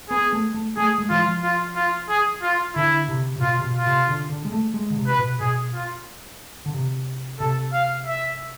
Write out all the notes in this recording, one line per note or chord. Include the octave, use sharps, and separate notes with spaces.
B3 G#4
A3
A3
A3 G#4
G#3
E3 F4
F3
F4
F4
G#4
F4
D3 E4
C3
C3
B2 F4
C3
B2
F4
C3
D3
D3
G#3
A3
G#3
D3
C3
B4
B2
B2 G#4
F4
D3
C3
C3 A4
F5
E5